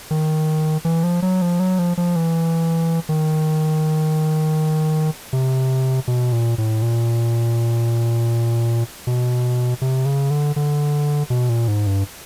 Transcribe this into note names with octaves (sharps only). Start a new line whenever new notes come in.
D#3
E3
F3
F#3
F3
F#3
F3
F3
E3
D#3
C3
B2
A#2
A2
A#2
B2
C3
C#3
D3
D3
B2
A#2
G#2
G2